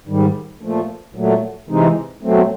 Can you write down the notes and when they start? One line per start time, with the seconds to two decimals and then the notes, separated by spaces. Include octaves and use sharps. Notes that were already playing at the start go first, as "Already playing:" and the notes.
0.08 G#2 D#3 G3
0.61 A#2 F3 A3
1.15 A#2 F#3 A3
1.69 C3 E3 G#3 C4 D#4
2.23 B2 F#3 A3 C4